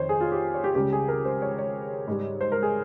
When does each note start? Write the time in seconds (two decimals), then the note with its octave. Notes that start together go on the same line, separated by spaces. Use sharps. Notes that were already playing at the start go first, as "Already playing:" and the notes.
Already playing: F2 D#3 C5 C#5
0.09 G#4
0.21 F4
0.32 G4
0.54 C#5
0.64 G4
0.75 C#2 C#3 G3 G4
0.93 G#4
1.08 A#4
1.25 C5
1.42 C#5
1.58 C#5
2.08 G#2 G3
2.41 C5
2.52 A#4
2.63 G#4